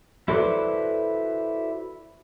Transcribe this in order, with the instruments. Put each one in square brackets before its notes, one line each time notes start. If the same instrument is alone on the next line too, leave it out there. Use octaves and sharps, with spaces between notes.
[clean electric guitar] E4 F#4 A4 B4 C5 D5